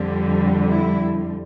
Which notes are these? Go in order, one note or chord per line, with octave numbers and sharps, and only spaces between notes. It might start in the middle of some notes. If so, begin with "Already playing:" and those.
Already playing: F2 D3 G3
E4